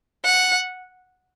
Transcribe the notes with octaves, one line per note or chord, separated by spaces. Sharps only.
F#5